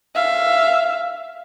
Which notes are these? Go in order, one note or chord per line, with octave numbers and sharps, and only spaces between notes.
E5 F5